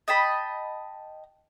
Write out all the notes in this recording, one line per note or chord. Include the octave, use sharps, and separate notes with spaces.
D#5 G5 A5 B5